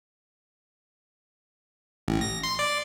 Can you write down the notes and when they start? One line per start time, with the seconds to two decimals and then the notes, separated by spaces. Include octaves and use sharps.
2.08 A1
2.21 A#6
2.43 C6
2.59 D5